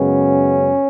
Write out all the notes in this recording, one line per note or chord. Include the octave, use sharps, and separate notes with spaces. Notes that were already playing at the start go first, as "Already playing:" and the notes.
Already playing: F#2 C#3 G#3 B3 C#4